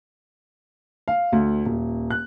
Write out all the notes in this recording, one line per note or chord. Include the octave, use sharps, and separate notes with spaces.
F5
D2
D#1
F#6